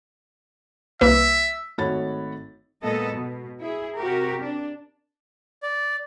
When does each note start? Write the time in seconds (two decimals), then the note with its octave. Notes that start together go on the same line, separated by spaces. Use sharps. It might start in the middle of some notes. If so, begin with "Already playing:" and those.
1.01 C2 A#3 B4 E5
1.78 G#1 A3 F#4 C#5 B5 A6
2.84 A#2 G#3 B3 A4 D#5
3.14 B2
3.61 E4 G#4
3.97 C3 F#4 G4 A#4
4.42 D4
5.63 D5